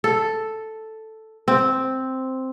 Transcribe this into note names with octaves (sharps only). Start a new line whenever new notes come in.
A4
C4